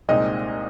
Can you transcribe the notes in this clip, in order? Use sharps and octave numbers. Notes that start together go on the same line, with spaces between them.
C2 A#2 G#3 C4 D#4 D#5